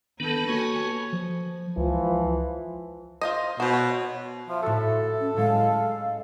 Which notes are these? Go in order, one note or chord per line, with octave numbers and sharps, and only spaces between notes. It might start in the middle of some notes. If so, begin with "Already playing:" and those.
D#3 B3 D4 A4 B4
A#3 F#4 C#5 G#5
F3
C#2 E3 F3
F4 C5 D#5
B2 F#4 C5
C#5
F3 E5
A2 F#4 A4
C#4
A2 G#3 F5